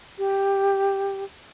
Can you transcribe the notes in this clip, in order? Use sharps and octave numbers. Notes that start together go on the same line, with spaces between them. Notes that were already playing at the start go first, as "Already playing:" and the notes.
G4